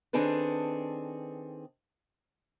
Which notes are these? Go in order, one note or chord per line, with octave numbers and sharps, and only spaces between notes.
D#3 C4 D4 G#4 A4 B4